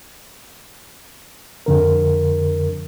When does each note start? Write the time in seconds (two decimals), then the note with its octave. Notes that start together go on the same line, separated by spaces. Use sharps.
1.66 F2 D3 A#4